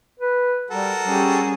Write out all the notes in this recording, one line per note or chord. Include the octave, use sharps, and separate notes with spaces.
B4
G3 F#4 A4 A#4
G3 C#4 G4 G#4